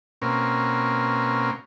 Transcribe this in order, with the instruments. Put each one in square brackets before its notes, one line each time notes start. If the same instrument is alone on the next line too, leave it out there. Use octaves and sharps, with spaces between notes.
[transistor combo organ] B2 A#3 C4 C#4